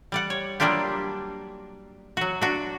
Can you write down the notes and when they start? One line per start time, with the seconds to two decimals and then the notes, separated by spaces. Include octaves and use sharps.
0.12 G3 D5 F#5
0.30 C#5
0.60 F#3 G3 A#3 D4 F4 G4
2.17 F#3 F#4
2.41 D4 F#4